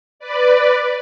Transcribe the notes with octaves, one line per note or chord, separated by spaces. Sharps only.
B4 D5